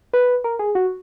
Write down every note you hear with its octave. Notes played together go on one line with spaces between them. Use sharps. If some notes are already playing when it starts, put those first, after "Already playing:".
B4
A#4
G#4
F#4